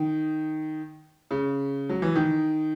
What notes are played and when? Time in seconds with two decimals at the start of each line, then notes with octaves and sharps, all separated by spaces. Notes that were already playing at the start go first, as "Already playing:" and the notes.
Already playing: D#3
1.31 C#3
1.89 F#3
2.02 E3
2.16 D#3